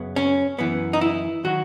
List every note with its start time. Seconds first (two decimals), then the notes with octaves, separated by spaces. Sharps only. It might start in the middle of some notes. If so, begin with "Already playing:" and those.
Already playing: F#2 C#3 F#3 B3
0.16 C#4
0.59 F#2 E3 B3
0.93 D#4
1.01 E4
1.44 D#3 F#3 F#4